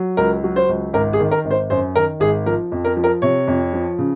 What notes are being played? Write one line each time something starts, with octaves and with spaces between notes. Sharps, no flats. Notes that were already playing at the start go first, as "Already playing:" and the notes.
Already playing: F#3
C#2 A#4
F#3
C5
C#2
G#1 A#4
G#4
D#3
A#4
G#1
C5
F#2 C5
D#3 A#4
G#1 G#4
F3 A#4
F2
A#4
F3
A#4
C3 C#5
F2
F3
C#3